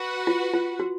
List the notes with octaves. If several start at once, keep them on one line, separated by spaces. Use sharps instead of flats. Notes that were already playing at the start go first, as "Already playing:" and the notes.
Already playing: F#4 B4 F#5
F4
F4
F#4